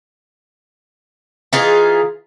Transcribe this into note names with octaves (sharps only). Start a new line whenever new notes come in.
E3 D#4 F4 G#4